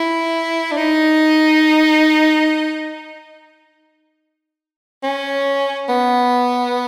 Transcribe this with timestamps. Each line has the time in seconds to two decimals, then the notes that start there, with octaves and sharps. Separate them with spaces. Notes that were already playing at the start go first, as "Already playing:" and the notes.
Already playing: E4
0.71 D4
0.77 D#4
5.03 C#4
5.89 B3